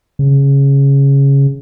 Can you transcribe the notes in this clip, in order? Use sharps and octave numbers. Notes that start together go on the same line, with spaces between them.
C#3